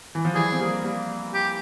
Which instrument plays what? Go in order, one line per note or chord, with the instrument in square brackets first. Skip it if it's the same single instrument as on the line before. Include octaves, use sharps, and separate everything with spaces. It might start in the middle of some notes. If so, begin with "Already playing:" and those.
[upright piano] E3
F3
[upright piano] E3 G3 [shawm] G#4
[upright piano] C4
G3 A#3
G3 A#3
[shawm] G4